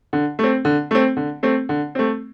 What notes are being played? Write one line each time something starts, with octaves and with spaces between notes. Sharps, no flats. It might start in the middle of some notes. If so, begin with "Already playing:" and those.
D3
A3 C4
D3
A3 C4
D3
A3 C4
D3
A3 C4